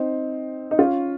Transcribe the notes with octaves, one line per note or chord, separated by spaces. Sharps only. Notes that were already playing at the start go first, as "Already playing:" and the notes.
Already playing: C4 D#4
D#4
C#4 F4